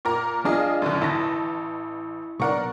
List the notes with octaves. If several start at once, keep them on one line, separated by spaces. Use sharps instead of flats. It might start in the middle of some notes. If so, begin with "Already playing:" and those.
A#2 A#4 A#5
D4 F4 G#4 D#5
F#2 B2 D3
A1 E4 A5 A#6
B1 D4 A#4 F#5 C#6